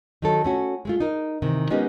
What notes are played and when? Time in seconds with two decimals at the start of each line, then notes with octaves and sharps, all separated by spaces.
0.22 D#3 F#3 A4
0.44 A3 C#4 F#4
0.85 G#3 A3 F4
1.00 D#4 A#4
1.42 C3 D#3 E3
1.70 G#3 B3 C#4 D#4 G4 A#4